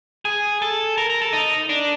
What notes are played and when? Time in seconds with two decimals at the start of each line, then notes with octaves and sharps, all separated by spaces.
0.25 G#4
0.62 A4
0.98 A#4
1.10 A#4
1.22 A4
1.33 D#4
1.69 D4